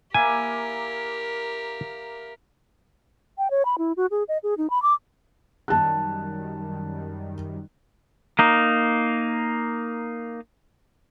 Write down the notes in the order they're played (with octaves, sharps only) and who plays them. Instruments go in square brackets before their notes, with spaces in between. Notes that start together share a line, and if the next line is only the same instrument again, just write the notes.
[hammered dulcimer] A#3 E4 [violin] G4 A#4 [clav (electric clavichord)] G#5
[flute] G5
C#5
B5
E4
F#4
G#4
D#5
G#4
D#4
B5
D6
[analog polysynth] F#2 D#3 G3 [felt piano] A5 F#6
[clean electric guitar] A#3 D#4